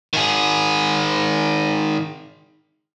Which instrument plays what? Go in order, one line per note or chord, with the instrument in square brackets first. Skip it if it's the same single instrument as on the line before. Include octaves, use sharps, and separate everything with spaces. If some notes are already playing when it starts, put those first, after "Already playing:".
[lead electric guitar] D#3 G#4